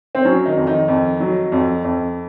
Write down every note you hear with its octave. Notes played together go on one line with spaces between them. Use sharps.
C4
F#3 C#4
D#3 D#4
F2
D#3 D#4
F2
F#3
F2
F2